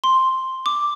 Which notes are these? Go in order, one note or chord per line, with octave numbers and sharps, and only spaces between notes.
C6
D6